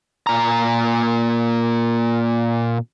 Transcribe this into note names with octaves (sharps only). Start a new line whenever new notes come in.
A#2 A#5